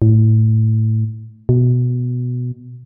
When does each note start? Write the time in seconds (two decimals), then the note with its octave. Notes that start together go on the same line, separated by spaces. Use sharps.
0.02 A2
1.49 B2